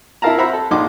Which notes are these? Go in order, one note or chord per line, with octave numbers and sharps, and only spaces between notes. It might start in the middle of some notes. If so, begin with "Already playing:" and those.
E4 F4 A#4 F5 A5 A#5
C5 E5 F#5 A#5 B5
A4
A#1 D#4 C6 D6